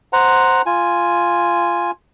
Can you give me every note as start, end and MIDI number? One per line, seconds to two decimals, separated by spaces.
0.13 0.62 72
0.13 0.62 78
0.13 0.62 82
0.66 1.91 65
0.66 1.91 80